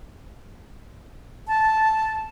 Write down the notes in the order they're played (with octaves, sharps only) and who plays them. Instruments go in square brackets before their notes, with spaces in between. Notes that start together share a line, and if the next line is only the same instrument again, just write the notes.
[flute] A5